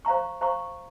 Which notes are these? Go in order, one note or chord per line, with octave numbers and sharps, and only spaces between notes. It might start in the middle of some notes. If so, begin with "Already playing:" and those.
C5 F5 A#5 C#6
C5 F5 A#5 C#6